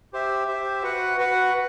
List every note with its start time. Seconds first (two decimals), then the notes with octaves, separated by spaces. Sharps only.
0.13 G4 C5 E5
0.48 G4 C5 E5
0.82 F#4 B4 F#5
1.18 F#4 B4 F#5